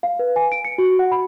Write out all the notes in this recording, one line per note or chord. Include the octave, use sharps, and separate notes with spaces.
F5
B4
G#5
D7
C#7
F#4
F#5
B5